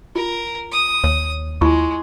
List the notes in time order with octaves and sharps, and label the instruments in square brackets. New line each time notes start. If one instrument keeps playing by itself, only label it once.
[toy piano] F4 [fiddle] A#4
[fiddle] D#6
[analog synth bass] D#2 [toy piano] C#5
[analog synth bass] D#2 [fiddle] G#3 [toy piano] E4 F4 C#6